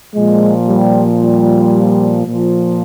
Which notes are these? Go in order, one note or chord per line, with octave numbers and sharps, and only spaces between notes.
A#2 F3 G#3
G3
G3
A#2 F3